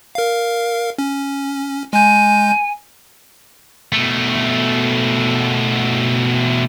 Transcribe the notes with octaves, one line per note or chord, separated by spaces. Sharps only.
A#4 F5
C#4
G#3 G#5 G6
B2 A3